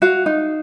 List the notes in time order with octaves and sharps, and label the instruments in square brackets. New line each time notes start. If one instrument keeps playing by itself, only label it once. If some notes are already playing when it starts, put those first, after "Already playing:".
[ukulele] F#4 F5
D#4